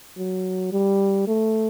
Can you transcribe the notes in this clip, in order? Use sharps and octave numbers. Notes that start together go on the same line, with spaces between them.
F#3
G3
A3